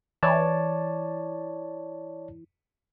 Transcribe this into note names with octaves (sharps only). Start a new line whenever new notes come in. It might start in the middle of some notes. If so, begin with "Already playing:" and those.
E3 C#5 D5 A5